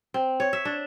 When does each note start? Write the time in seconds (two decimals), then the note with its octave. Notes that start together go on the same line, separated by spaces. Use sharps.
0.14 C4
0.40 C#5
0.53 E5
0.65 D4